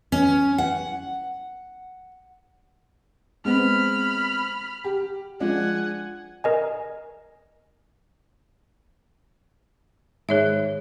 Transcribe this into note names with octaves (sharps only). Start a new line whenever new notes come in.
C#4
F#5
G#3 B3 C4 B5 F6
G4
F3 G#3 D4 F#5 G#5
A#4 D#5 G#5
G#2 D#3 G#4 C#5 E5